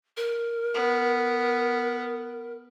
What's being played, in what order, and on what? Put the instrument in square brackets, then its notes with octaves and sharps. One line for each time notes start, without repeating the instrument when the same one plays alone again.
[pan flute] A#4
[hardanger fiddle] B3